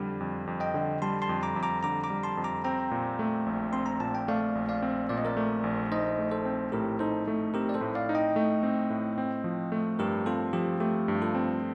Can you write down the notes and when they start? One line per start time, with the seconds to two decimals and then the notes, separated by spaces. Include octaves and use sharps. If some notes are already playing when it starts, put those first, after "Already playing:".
Already playing: F2 D3 G3
0.20 F2
0.47 F2
0.60 D#5 G5
0.74 D3
1.02 G3 A5 C6
1.22 A5 C6
1.29 F2
1.43 A#5 D6
1.56 F2
1.63 A#5 D6
1.83 D3 A#5 D6
2.03 A#5 D6
2.10 G3
2.23 A5 C6
2.37 F2
2.44 A#5 D6
2.64 C4 G5 A#5
2.91 A#2
3.19 A3
3.46 A#1
3.73 C4 C6
3.86 A#5
4.00 A#2 A5
4.15 G5
4.28 A3 D5 F5
4.55 A#1
4.69 D5 F5
4.82 C4
5.09 A#2 D5
5.18 D#5
5.25 A#4 D5
5.37 A3
5.64 A#1
5.91 D#4 C5 D#5
6.18 A3
6.31 A4 C5
6.45 C4
6.72 A2 G4 A#4
6.99 D#4 A4 C5
7.27 A3
7.54 C4 G4 A#4
7.69 D5
7.74 A4 C5
7.81 A2
7.95 D5 F5
8.09 D#4
8.15 D#5 G5
8.36 A3
8.63 C4
8.90 A2
9.18 C4
9.44 F3
9.72 A3
9.99 G2 G4 A#4
10.26 C4 F4 A4
10.53 F3 G4
10.80 A3 G4
11.08 G2
11.22 F4 A4
11.35 C4